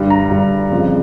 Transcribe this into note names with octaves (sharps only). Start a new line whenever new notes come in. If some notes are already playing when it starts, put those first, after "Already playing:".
Already playing: G2 D3 G3
A#5
G2 D3 G3
F2 C#3 F3